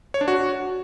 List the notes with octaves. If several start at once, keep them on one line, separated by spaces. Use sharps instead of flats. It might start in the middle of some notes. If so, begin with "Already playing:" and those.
C#5
D4
F#4